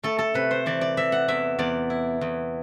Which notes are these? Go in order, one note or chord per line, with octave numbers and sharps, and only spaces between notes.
A3 A4
A4
C3 B4
C5
E3 D5
D5
E3 E5
F#5
E2 E5
E2 D5
E4
E2